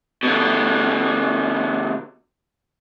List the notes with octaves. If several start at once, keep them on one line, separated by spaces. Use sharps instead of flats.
B2 D3